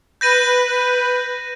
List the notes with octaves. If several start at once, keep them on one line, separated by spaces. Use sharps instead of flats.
B4 G6 A#6 D#7